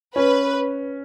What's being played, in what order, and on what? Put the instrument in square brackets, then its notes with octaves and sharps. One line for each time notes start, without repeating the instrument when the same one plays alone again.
[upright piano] C#4 [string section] B4